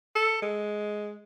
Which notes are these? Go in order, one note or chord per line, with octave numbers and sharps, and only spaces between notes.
A4
G#3